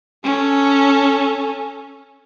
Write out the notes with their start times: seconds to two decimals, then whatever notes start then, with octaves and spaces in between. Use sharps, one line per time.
0.24 C#4 A4